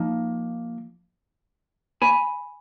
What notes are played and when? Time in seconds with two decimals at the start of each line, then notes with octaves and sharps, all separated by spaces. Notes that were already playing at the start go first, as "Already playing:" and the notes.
Already playing: F3 A#3 D#4
2.02 G#5 B5